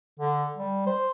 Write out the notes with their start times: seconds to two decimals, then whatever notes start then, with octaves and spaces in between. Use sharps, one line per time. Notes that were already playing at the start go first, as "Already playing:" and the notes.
0.19 D3
0.56 G3
0.86 C5